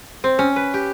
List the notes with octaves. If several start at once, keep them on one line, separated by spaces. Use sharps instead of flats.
C4
C#4
B4
G4